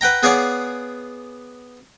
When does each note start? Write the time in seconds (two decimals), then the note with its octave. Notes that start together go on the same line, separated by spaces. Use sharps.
0.01 B4 F#5 G5 A#5
0.23 B3 G#4 C#5 D5 F5 F#5